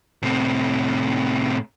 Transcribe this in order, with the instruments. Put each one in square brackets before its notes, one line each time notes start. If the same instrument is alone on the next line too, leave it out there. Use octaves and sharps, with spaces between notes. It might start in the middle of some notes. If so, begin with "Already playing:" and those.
[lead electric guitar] A2 C3